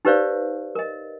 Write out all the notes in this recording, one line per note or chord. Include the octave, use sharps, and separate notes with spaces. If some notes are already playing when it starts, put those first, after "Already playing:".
D#4 G4 B4 C5 D5 F5
A#4 D#5